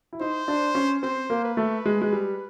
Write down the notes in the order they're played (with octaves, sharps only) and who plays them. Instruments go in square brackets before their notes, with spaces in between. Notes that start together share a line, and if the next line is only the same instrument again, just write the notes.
[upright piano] E4
[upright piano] D#4 [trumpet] C5
[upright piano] D4
C#4
[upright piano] C4 [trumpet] C5
[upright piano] A#3
[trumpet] B4
[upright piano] A3
G#3
G#3
G3